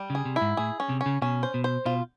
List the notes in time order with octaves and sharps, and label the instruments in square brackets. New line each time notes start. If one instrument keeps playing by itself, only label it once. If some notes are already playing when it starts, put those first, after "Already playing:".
Already playing: [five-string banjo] G3
[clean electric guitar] C#3 [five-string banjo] G#4
[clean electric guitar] C3
[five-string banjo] E4
[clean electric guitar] G#2
[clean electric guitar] A2 [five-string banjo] G#4
[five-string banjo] C#4
[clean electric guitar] C3
[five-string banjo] C#4
[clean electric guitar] C#3
[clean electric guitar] B2 [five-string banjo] C#4
[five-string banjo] C5
[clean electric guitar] B2
[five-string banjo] C5
[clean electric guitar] B2 [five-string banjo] F4